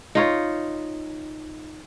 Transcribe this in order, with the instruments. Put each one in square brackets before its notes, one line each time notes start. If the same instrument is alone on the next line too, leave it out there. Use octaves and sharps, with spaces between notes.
[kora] D#4 F4 C#5